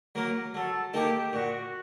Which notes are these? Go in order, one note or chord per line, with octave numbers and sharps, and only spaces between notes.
F#3 A#3 A#4
F#3 A4
A#3 D#4 G4 A4
A#2 F#4